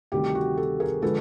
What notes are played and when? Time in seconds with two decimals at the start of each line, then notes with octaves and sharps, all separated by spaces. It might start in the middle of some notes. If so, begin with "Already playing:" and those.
0.12 D2 C3 D#3 G3 G4
0.35 F#4
0.57 G4 A4
0.80 G#4 A#4
1.02 D3 F3 G#3 A4 B4